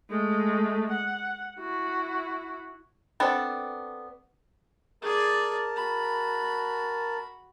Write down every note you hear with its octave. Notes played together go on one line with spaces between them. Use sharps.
G#3 A3
F#5
E4 F#4
B3 C4 D4 A4
G#4 A#4 D5 A5
F#4 B5